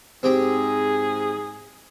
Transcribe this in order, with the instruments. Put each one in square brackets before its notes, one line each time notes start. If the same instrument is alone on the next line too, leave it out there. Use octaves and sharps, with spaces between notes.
[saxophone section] G#2 G#4 [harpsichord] C4 G4 G5